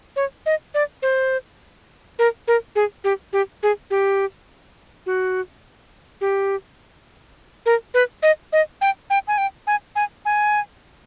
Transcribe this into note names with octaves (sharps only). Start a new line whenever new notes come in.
C#5
D#5
D5
C5
A#4
A#4
G#4
G4
G4
G#4
G4
F#4
G4
A#4
B4
D#5
D#5
G5
G5
G#5
G5
G#5
G#5
G#5